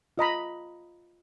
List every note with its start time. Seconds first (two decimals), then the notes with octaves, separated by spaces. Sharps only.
0.18 F4 D#5 A#5 B5